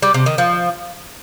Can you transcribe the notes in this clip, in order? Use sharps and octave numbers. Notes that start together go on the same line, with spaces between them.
G3
C3
D#3
F3